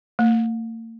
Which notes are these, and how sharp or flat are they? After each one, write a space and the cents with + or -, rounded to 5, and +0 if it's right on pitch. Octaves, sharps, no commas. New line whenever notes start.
A#3 -45